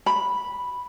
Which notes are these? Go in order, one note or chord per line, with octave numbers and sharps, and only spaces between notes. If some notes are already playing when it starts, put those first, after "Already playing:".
B5